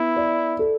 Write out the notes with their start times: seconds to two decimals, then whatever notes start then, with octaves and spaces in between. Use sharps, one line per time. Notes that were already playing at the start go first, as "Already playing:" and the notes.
Already playing: B3 E4
0.16 D5
0.59 A4